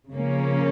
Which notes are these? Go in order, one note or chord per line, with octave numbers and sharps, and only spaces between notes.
C#3 F3 A#3 C#4